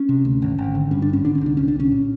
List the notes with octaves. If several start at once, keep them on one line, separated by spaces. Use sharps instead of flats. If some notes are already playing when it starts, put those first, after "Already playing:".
Already playing: C#4
C3
D2
G#1
G#1
D3
G2 C#4
D4
G#1 C#4
D3 D4
C#4
C2 D4
C2 C#4
D4
C2 C#4
A#2